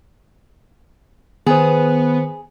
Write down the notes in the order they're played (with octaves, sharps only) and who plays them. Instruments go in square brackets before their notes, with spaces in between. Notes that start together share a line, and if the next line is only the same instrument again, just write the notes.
[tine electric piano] D#3 C5 [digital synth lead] B3 [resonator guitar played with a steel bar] G#4